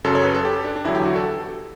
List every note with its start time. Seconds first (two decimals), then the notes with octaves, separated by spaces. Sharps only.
0.04 F#2 C#3 F#3 A4
0.15 C#5
0.24 B4
0.34 A4
0.45 G4
0.64 D4
0.76 D4
0.84 E2 D3 F#3 E4
0.95 G4
1.05 F#4
1.16 A4